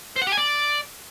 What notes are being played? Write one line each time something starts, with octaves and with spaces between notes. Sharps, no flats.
C5
F#5
G4
G#5
D5